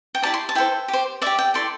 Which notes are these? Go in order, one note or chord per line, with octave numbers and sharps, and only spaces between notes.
G5
E4 G4 D5 A5
C6
A5
E4 A4 C5 G5
G4
C5
G4 D5 E5
G5
E4 A4 D5 C6